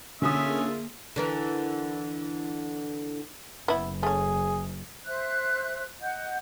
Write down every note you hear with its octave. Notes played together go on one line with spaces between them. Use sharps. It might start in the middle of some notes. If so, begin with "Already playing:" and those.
D3 A#3 C#4 F4 G#4 E5 D#6
D3 E3 A#4
F#1 B3 E4
A3 C#4 G#4
C5 E5 F#6
D#5 F#5 G6